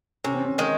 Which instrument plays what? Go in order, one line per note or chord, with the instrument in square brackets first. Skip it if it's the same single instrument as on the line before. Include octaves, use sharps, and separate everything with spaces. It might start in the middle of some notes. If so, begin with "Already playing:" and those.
[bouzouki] C3 [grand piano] C#4
[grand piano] C4
C#4
[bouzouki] D#3 G#3